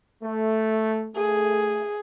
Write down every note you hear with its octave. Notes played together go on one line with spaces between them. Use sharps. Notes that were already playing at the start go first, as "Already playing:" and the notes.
A3
A3 G#4